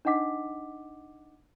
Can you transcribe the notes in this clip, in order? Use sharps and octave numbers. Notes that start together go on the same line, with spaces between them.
D4 D#4 D#5 F#5 D6 B6